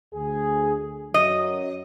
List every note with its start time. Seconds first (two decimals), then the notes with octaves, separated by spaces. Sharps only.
0.14 D2 G#4
1.14 F#2 F#3 D#5